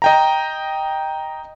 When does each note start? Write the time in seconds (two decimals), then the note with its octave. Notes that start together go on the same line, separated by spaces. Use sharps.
0.02 D#5 G5 A#5